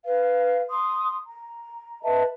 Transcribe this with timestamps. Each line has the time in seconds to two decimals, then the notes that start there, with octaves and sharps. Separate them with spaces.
0.04 B4 F5
0.70 C6 D#6
1.24 A#5
2.02 B4 D#5 E5 A5